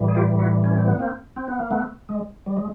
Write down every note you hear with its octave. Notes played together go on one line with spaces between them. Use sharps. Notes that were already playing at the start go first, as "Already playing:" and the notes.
Already playing: A2 E3 G3
G#4
F4 G4
E4 F#4
C#4
C4
B3
A#3 C4
C4
B3
A#3
A3 B3
G#3
G3
G#3